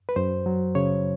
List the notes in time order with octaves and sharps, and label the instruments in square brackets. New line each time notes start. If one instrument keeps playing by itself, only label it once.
[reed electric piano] B4
F#2 C5
F#3
C#3 C#5